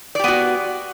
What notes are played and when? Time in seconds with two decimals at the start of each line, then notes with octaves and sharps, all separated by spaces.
0.15 D5
0.19 G4
0.24 B3
0.28 F#4